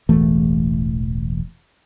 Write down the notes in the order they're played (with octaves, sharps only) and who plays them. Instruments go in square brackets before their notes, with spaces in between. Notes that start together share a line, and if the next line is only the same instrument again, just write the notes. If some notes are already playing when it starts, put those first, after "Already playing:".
[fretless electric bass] E1 A1 E3 A3